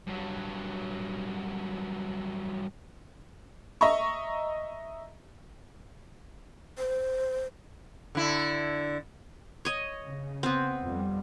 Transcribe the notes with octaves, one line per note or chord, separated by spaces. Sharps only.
G2 F#3
D#5 E5 A#5 C#6
C5
D3 E4
C#5 D#5
C#3
B3 C4
F2 G3